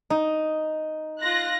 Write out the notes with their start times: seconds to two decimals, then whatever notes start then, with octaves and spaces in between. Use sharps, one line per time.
0.10 D#4
1.21 F4 F#6 A#6